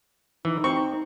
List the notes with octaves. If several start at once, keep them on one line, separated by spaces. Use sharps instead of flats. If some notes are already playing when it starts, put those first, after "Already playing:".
E3 D#4
C4 C#6